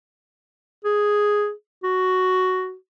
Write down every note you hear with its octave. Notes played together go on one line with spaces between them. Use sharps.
G#4
F#4